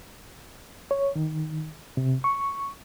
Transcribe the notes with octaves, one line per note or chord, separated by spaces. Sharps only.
C#5
D#3
C3
C#6